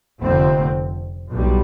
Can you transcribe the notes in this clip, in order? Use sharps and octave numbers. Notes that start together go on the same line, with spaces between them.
F1 F2 D3 A3 C4
B1 A2 G3